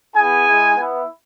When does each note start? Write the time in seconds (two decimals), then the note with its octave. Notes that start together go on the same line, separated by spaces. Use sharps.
0.16 B3 E4 G#4 G#5
0.47 G#3 E4
0.76 B3
0.81 E4